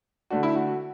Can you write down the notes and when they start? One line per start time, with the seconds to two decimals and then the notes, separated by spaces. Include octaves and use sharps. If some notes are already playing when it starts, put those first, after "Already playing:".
0.30 D3 A3 D4 F#4
0.43 E4
0.55 F#4
0.67 F#4